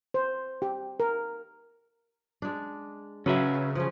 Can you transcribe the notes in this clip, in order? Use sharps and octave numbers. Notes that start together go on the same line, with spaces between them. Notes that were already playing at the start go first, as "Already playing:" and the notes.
C5
G4
A#4
G#3 D4
C#3 F#3 C#4 B4 E5
F3 C#4